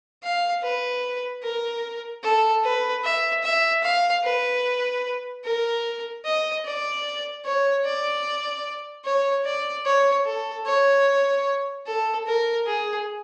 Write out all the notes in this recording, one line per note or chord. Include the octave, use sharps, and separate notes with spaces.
F5
B4
A#4
A4
B4
E5
E5
F5
B4
A#4
D#5
D5
C#5
D5
C#5
D5
C#5
A4
C#5
A4
A#4
G#4